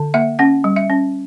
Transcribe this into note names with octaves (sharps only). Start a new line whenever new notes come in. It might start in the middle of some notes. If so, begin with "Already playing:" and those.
Already playing: D3
A#3 E5
C#4 F#5
G3
E5
C#4